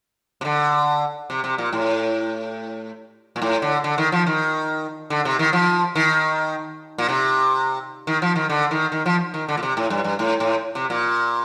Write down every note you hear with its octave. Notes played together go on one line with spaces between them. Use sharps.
C3
D3
C3
C3
A#2
A2
A#2
A2
D3
D3
D#3
F3
D#3
D3
C3
D#3
F3
D#3
A#2
C3
D#3
F3
D#3
D3
D#3
D#3
F3
D#3
D3
A#2
C3
A2
G2
G2
A2
A2
C3
A#2